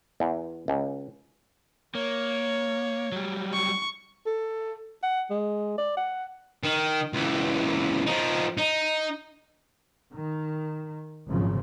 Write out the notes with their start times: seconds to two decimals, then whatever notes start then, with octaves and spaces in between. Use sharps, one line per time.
0.20 E2
0.68 C#2
1.95 A#3 C#5
3.12 F#3 G3
3.53 C#6
4.26 A4
5.03 F#5
5.30 G#3
5.78 D5
5.97 F#5
6.64 D#3
7.13 C#2 E3
8.06 F3 D#4
8.58 D#4
10.14 D#3
11.29 G#1 F#2 A#2 C#3 F3